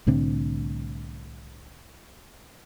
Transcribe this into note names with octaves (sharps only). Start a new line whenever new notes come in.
C2 A2 D3 C4